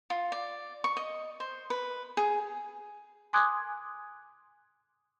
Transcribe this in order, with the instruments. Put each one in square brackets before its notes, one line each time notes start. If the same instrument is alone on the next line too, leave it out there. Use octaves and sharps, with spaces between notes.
[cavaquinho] F4
D5
C#6
D#5
C5
B4
G#4
[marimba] G#5 C6 D6 D#6 F#6 G#6